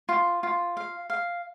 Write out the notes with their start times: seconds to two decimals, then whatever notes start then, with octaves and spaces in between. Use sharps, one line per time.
0.09 F4
0.43 F4
0.77 F5
1.10 F5